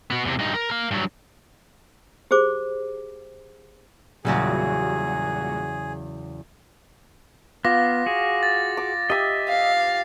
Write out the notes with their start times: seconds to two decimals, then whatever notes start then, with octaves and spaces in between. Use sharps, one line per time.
0.10 B3 F#4
0.25 E2 C3
0.39 G2 D#4
0.54 A#4
0.70 A#4 F5
0.91 G2 F#3
2.31 G4 G#4 C5 D6
4.25 E2 A#2 C#3 F#3 G3 F#4 G#4
7.65 B3 F4 D6 A#6
8.06 F#4 G#4
8.43 A6
8.77 D6
9.10 G4 D#5 E5 D#6
9.49 F5